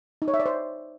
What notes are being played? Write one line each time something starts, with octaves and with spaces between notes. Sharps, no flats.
D#4
C#5
E5
D5
C5